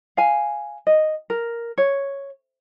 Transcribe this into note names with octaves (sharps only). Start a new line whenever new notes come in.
F5 G#5
D#5
A#4
C#5